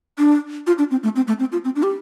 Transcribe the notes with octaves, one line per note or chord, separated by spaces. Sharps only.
D4
F4
D4
C4
A3
C4
A3
C4
F4
C4
D4
G4